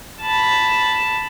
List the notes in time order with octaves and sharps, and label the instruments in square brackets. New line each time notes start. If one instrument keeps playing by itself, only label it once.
[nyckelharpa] A5 B5